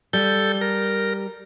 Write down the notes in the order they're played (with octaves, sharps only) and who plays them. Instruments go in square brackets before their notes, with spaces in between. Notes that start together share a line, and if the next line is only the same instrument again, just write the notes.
[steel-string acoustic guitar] G3 [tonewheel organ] A4 G6
[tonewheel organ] A#4